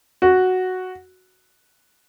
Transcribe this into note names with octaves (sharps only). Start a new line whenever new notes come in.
F#4